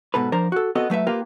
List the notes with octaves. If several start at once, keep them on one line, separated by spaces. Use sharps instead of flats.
G#2 B2 A4 B4
F3 D4 A#4 C5 A#5
F#4 A4
B3 C4 F#4 A4 D#5
F#3 A3 B4 E5
A#3 F4 G4 A#4 B4